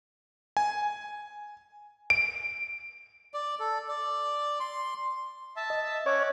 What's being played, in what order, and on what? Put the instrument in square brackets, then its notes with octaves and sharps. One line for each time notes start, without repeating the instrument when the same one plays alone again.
[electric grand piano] G#5
D7
[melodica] D5
A4
D5
C6
[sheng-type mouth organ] E5 A5
[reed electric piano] D#5
[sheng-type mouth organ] C#4 F#5 D6 [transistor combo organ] C#5